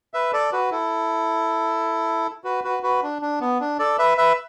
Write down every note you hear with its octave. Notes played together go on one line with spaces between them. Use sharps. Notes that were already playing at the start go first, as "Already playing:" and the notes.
B4 E5
A4 D5
F#4 B4
E4 A4
F#4 B4
F#4 B4
F#4 B4
D4
D4
B3
D4
A4 D5
B4 E5
B4 E5